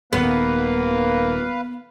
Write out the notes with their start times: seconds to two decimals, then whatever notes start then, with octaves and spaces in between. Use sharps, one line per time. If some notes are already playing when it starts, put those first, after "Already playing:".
0.13 D#1 D#2 A#3 B3 B4 F5